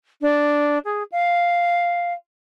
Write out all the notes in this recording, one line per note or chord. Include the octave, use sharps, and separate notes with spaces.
D4
G#4
F5